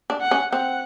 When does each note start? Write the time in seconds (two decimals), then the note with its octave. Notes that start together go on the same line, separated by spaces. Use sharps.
0.10 D4
0.21 F#5
0.31 C#4
0.53 C4 F#5